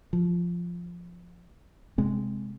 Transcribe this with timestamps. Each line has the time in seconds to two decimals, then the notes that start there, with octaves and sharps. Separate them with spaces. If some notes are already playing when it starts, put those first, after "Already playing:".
0.13 F3
1.98 C3 G#3 C4